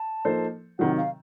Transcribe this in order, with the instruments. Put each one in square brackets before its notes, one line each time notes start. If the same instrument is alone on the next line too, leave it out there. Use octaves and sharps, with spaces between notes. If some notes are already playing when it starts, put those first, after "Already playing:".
Already playing: [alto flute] A5
[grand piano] F3 A#3 D#4 A4 C5
[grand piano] C3 D#3 F#3 [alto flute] F#5
[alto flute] F5